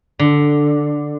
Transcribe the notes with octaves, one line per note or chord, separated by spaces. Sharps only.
D3